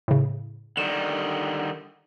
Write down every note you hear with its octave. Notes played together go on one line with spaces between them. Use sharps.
A2 C#3
D3 D#3 G3 E7